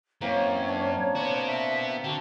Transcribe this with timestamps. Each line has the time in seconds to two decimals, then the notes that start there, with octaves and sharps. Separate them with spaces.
0.21 F#2 E3 A#3 C4 C#5
0.68 D4
1.16 B3 F#4 A#4 C5
1.46 E5
2.04 D3 F#4 A4 F#5 G5